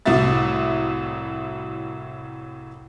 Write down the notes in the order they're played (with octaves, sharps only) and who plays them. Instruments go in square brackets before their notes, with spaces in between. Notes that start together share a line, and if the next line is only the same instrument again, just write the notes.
[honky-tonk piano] C2 A2 F#4 E5 A6